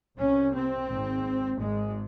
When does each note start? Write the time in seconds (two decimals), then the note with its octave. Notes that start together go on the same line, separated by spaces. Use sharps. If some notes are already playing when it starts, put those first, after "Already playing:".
0.18 C2 C3 C#4
0.53 C4
0.88 G#1 G#2
1.58 G#1 G#2 G#3